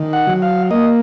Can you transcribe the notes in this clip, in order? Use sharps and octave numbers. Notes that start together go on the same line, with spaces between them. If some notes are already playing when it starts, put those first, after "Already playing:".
Already playing: D#3
F#5
F#3
F5
A#3 D#5